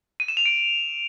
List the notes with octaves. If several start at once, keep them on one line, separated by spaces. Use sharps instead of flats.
D#7
E7
F7
D7